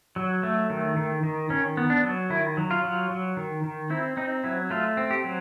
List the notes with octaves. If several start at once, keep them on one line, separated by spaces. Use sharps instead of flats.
F#3
A3
D#3
D#3
D#3
D#3 C#4
B3
D4
F#3
D#3 E4
F#3
F4
F#3
F#3
D#3
D#3
C4 E4
C4 D#4
F#3 E4
A3 F4
C4
G4
F#3